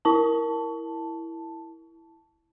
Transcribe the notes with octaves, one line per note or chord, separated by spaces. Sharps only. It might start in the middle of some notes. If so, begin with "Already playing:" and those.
E4 A5